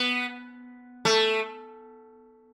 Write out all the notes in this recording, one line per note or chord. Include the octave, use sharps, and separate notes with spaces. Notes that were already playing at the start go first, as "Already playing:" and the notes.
Already playing: B3
A3